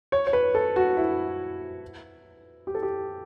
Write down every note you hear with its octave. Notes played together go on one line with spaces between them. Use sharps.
C#5
C#5
B4
A4
F#4
E4
G4
A4
G4